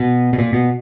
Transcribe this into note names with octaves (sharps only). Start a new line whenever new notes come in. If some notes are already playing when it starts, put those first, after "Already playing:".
Already playing: B2
B2
A#2
B2